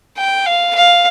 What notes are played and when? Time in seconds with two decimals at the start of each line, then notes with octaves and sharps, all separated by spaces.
0.17 G5
0.46 F5
0.75 F5